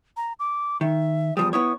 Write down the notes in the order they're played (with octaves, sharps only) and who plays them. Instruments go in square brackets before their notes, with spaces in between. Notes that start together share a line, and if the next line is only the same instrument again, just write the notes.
[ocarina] A#5
D6
[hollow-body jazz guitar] D#3 [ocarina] E5
[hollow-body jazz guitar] E2 F3 G3 [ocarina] D#6
[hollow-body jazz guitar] B3 E4 C#5 [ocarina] D#6